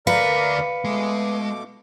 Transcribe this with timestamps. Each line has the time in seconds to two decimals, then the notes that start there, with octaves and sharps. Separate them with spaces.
0.07 D2 A#4 B4 D5 E5 F5 A#5 C#7
0.85 B2 G#3 A3 D6